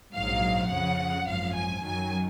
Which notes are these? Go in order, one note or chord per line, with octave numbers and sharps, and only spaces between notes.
A#1 G#2 F#3 F5
F2 C#3 F3 F#5
G#1 F#2 F3 F5
G#5
F#2 D#3 F#3 G#5